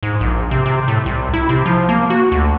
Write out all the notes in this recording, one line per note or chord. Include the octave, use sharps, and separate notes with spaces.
G#2
A#1
C3
C3
A2
C2
E4
C3
F3
A#3
F#4
D2